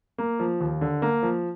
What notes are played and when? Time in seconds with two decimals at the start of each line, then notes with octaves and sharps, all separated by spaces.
0.18 A#3
0.40 F3
0.60 D#2
0.81 D3
1.02 A#3
1.23 F3